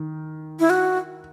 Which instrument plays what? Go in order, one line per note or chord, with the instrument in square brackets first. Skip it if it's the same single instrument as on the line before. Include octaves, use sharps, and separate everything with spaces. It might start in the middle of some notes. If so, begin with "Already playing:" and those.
Already playing: [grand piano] D#3
[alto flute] E4
F#4